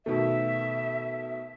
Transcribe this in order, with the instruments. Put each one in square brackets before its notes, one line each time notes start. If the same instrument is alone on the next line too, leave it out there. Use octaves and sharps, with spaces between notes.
[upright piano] B2 D#3 A3 [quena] E5